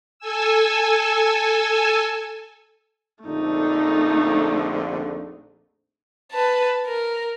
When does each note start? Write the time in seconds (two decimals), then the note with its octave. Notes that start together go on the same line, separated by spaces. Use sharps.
0.19 A4 G#5 E6
3.25 A#1 F2 D3 A3 D#4
6.32 B4 A5
6.86 A#4